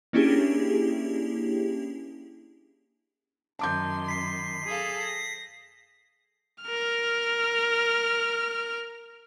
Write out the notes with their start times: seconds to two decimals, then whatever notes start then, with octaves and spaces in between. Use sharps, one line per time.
0.13 A#3 C#4 D4 E4 G4 G#4
3.59 F#2 D#3 A5 C6 D6 G6
4.08 B6 C7
4.65 G#4 A4 F5
5.02 A#6
6.63 A#4 F6